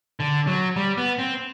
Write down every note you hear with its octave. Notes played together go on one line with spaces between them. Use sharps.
D3
F#3
G3
B3
C4